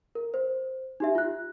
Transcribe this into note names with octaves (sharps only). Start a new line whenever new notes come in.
A#4
C5
D#4 G4 E5
F4 F#6